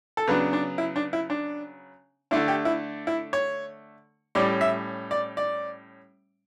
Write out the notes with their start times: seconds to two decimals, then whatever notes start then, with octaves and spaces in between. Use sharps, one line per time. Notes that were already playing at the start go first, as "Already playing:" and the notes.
0.17 A4
0.28 C#3 F#3 B3 D4 B4
0.53 D4
0.78 E4
0.96 D4
1.13 E4
1.30 D4
2.31 D3 A3 D4 E4
2.48 G4
2.65 E4
3.07 E4
3.33 C#5
4.35 A2 G3 C#4 D5
4.61 E5
5.11 D5
5.37 D5